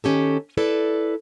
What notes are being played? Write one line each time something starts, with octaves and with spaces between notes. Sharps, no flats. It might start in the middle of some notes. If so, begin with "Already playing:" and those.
D#3 C#4 G4 A4
E4 A4 B4 D5